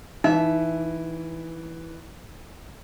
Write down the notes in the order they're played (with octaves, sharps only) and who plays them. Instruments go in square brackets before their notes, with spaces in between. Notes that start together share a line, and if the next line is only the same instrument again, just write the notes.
[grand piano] E3 [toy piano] D#4 [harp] E5